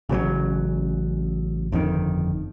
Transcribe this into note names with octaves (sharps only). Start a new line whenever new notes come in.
A1 C#3 E3 F#3
G1 F2 A#2 D#3